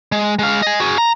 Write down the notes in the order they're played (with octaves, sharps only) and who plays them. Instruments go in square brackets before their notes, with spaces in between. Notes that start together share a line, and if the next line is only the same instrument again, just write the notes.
[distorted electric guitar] G#3
G#3 F5
D#5 G#5
F#4 G#4
A#5